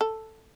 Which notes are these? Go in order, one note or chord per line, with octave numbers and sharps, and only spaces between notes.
A4